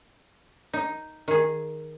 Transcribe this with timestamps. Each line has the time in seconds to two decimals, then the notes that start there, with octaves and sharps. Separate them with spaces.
0.73 D#4
1.28 D#3 G#4